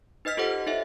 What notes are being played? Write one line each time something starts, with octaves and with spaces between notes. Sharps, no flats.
D#4 B4 D#5 F6 B6
F4 G4 A4 C5 D#5 F#5
D#4 A4 C#5 E5